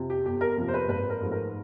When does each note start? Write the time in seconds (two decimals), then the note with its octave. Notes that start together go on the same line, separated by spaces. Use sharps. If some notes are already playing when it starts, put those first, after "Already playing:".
Already playing: F2 C3
0.10 G4
0.25 G1 G4
0.41 A#4
0.57 F2 C3 F3 A#3
0.68 C5
0.74 B4
0.88 G#1 B4
1.10 A#4
1.21 G#2 F3 A3 C4
1.31 A#4